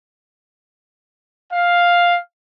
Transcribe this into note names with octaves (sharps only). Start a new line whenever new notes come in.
F5